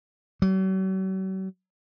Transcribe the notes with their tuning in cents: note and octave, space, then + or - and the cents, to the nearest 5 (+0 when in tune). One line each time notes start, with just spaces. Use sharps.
F#3 +45